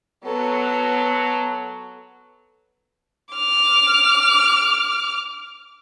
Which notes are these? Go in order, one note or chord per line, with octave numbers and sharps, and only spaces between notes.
F#3 B3 A4
D6 F6